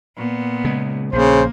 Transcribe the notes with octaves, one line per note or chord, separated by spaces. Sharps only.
A#2 B3
C#3 G#3
A#1 C#3 A#3 C5